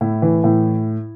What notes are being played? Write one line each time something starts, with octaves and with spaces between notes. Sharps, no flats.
A2 E4
E3
A2